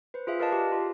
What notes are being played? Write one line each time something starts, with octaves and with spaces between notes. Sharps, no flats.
B4 C5
F4 G#4 E5 F5
A#4 B4 D5 D#5 F5 A5
G4
F4